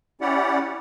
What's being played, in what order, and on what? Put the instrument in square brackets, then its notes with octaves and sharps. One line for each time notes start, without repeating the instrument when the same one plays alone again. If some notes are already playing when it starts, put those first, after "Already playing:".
[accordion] C#4 E4 G4 D5 F#5